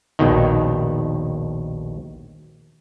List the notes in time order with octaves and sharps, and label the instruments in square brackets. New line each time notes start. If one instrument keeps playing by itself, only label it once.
[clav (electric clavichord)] A#1 D#2 B2 D#3